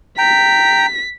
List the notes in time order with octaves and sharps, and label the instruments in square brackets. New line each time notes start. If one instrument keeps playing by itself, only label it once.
[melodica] G5 A#5 [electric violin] B6